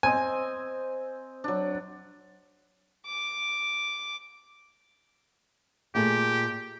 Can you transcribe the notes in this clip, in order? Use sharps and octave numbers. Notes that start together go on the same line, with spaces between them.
C4 C5 D#5 G#5
F#3 D4
D6
A#2 A3 G4 G#4